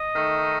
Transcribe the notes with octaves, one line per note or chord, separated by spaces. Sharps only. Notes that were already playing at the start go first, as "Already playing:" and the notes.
Already playing: D#5
D#3 A3 D#4